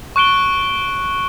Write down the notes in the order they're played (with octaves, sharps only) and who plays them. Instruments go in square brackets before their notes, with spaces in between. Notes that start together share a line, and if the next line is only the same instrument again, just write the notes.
[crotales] C#6 F#6 D7 G7